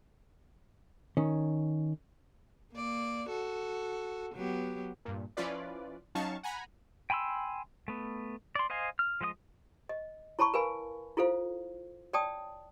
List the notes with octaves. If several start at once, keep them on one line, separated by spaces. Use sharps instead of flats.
D#3 C#4
A#3 D5
F#4 A4
F#3 B3 G4
G2 A#2
F3 C#4 E4 F4 B4 D5
F#3 C#4 D#4 F5 A5 C#6
F#5 G#5 A#5 B5
G5 G#5 B5 C6 E6
A3 B3
D5 C6
C5 D#5 F5 G#5 C6
F6
F3 G#3 D#5 F#5 D#6
D#5
E4 C#5 A5 B5 C#6
A#4 B4 F5 G#5 B5
E4 F4 A4 C5 F5
C#5 D5 G5 A5 D#6